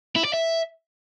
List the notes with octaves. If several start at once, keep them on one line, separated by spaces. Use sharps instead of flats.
E4
D5
E5